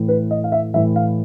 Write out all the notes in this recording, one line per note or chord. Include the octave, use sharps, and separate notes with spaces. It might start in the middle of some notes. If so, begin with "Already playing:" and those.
Already playing: A2 E3
B4
D#5
F5
E5
A2 E3 E5
F5